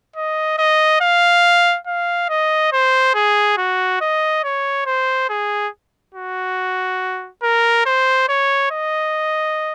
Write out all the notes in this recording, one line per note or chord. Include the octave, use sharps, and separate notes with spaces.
D#5
D#5
F5
F5
D#5
C5
G#4
F#4
D#5
C#5
C5
G#4
F#4
A#4
C5
C#5
D#5